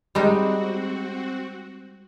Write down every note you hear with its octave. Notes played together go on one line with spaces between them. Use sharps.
G3 G#3 C4 D#4 F#4